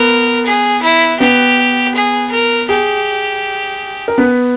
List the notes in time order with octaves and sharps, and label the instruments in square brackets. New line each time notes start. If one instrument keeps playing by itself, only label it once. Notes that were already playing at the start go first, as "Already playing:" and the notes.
Already playing: [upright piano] B3 B4 [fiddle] A#4
[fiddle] G#4
E4
[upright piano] B3 B4 [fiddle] G4
[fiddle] G#4
A#4
[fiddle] G4 [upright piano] G#4
[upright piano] A#4
B3 B4